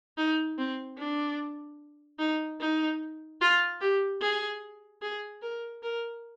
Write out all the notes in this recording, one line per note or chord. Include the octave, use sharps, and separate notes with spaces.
D#4
C4
D4
D#4
D#4
F4
G4
G#4
G#4
A#4
A#4